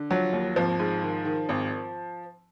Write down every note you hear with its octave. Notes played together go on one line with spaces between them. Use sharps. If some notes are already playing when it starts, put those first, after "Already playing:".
Already playing: D3
F3 F#3
D#2
G#1 F3
G#2
D#3
D#3
G#1